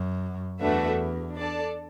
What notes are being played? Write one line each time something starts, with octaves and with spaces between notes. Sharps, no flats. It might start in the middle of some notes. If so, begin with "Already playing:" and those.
Already playing: F#2
E2 A3 D4 F#4 B4 E5
D4 A4 D5 A5